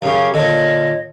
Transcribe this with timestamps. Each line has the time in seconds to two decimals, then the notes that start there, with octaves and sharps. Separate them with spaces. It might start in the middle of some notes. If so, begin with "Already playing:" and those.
0.02 F#2 C#3 C#4 G4 F5
0.34 A#2 D3 C#5 D#5